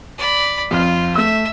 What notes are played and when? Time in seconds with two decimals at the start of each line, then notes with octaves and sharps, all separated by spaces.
0.18 D5 B5
0.71 F2 F4 F6
1.15 A3 E5 E6